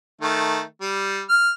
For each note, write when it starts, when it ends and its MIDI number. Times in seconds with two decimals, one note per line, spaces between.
0.21 0.61 51
0.21 0.61 57
0.81 1.21 55
1.29 1.51 89